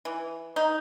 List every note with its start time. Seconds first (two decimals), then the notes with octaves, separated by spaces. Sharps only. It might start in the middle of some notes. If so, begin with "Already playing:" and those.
0.05 E3
0.56 D#4